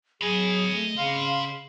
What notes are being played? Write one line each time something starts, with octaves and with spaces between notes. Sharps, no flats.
F#3 G#4 D#5 B5
A3
C#3 F5 C6